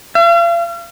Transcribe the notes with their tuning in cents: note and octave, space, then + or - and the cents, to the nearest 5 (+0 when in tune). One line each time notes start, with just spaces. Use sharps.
F5 -40